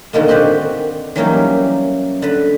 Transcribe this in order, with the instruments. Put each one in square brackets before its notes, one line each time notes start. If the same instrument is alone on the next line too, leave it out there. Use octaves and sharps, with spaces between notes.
[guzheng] B2 D3 D#3 G#3 A#3
C4 F#4 B4 C5 D5
E3 F#3 G3 A#3 C#4 D#4
D3 B4